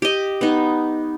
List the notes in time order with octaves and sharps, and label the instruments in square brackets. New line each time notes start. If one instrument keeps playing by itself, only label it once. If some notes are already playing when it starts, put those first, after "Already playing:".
[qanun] G4 D#5
B3 D#4